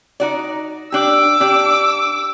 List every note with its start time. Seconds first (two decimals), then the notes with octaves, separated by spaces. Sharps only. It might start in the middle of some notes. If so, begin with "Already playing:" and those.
0.20 D#4 F#4 D5
0.92 D4 G4 D6 E6
1.40 D4 G4